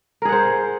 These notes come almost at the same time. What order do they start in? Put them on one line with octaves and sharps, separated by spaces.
A#4 G#4 F#5 C5